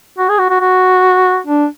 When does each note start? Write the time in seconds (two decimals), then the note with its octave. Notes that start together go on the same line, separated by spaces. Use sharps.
0.18 F#4
0.29 G#4
0.39 F#4
0.50 F#4
0.60 F#4
1.47 D4